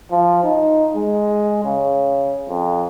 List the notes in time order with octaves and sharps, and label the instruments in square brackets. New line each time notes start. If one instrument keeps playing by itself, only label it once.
[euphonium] F3
D#4
G#3
C#3
F2